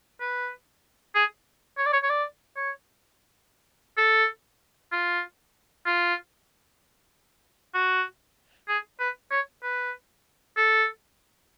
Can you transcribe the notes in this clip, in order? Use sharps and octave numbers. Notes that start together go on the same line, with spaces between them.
B4
G#4
C#5
D5
C#5
C#5
D5
C#5
A4
F4
F4
F#4
G#4
B4
C#5
B4
A4